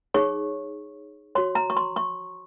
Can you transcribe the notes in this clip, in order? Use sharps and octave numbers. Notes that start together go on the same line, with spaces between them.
D#4 G#4 C#5 C#6
F#4 C#5 C6
A#5
C#6
C6
C#6